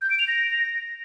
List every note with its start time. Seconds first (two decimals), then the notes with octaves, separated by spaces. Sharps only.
0.02 G6
0.10 D7
0.19 F7
0.28 A#6